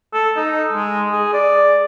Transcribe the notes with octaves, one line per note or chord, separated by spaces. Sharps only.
A4
D#4
G#3
G#4
D5